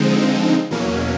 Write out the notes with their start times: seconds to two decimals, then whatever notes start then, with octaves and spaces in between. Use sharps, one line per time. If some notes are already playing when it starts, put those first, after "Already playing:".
Already playing: D3 F3 G#3 C4 D#4
0.71 E2 B2 F#3 A#3 C#4